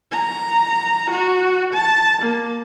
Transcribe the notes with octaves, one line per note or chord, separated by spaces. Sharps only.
A#5
F#4
A5
A#3